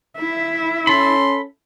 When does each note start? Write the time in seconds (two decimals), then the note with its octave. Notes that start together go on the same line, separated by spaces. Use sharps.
0.17 E4 E5
0.87 C#4 A4 B5 C6